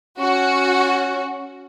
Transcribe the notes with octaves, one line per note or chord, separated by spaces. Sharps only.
C#4 F#4